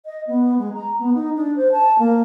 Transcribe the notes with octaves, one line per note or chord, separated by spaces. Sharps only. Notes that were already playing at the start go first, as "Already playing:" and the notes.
D#5
B3
G#3
A#5
B3
D#4
D4
C5
A5
A#3